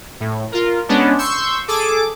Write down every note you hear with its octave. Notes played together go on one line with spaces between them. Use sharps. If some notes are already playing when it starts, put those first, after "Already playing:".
A2
F4 A#4
G#3 B3 C#4 D4
C6 C#6 E6 G6
G#4 A4 D6